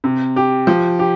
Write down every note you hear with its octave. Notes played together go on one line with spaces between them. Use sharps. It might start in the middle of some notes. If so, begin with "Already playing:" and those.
C3
G4
F3
G4